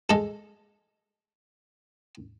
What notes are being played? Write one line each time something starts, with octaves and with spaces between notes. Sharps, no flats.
G#3 A4